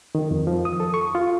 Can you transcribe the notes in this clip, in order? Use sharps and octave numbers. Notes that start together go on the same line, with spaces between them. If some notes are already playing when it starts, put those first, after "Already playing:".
D#3
F2
F3
D#6
A4
C#6
F4